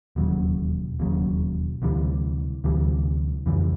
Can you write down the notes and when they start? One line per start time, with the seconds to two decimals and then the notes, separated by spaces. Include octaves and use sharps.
0.16 E1 D#2 C#3 F#3
1.00 E1 D#2 C#3 F#3
1.82 D2 C3 E3 G3
2.64 D2 C3 E3 G3
3.46 F2 C#3 E3 G3